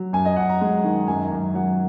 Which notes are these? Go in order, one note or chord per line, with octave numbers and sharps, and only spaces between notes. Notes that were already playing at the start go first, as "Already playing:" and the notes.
Already playing: F#3
F#2 G#5
D#5
F#2 F#5
A#5
G#3
D#3
F#2 G#5
F#2
F#3 F#5